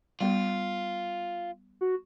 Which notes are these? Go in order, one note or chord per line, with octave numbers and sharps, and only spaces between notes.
G3 B3 F4
F#4